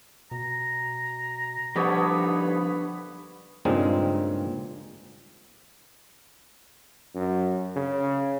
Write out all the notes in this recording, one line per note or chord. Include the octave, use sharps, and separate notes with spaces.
B2 A#5
B1 D3 F3 G3 B3 C#5 B5
G2 A#2 C#3 G#3 C4 D#4
F#2
C#3